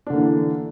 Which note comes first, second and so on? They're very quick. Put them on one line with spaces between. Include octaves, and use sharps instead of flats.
D4 D3 A#3 E3